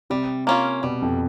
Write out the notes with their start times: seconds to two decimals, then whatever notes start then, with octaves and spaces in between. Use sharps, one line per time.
0.10 C3 G3
0.47 A#3 C#4 F4
0.83 B2 G3
1.02 F2